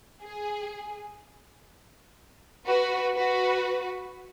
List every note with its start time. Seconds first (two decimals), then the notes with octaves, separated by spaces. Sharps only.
0.23 G#4
2.67 F#4 B4
3.16 F#4 B4